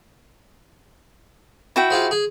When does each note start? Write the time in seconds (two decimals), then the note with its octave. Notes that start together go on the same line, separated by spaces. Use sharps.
1.76 E4 F#4 G5
1.90 F4 G#4 C5
2.11 G#4